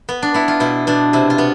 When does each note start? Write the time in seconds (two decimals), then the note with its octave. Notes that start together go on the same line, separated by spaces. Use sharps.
0.09 B3
0.22 D4
0.34 B3 E4
0.48 F4
0.60 B2 E4
0.87 B2 D4
1.13 C3 E4
1.30 F4
1.38 B3